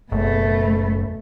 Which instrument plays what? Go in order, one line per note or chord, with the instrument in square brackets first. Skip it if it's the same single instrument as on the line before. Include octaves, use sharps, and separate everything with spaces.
[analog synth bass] F#1 [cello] B2 A3